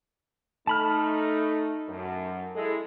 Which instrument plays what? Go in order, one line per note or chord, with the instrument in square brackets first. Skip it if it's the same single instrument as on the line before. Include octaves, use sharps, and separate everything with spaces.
[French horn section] A3 D#4 [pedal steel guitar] A5 B5 F6
[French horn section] F#2
G#3 E4 A4